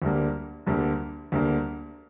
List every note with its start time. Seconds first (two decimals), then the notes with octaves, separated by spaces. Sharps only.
0.02 D2 D3 G3 A#3
0.66 D2 D3 G3 A#3
1.32 D2 D3 G3 A#3